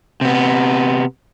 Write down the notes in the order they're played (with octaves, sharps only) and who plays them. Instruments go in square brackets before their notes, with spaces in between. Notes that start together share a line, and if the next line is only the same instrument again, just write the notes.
[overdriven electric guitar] C3 B3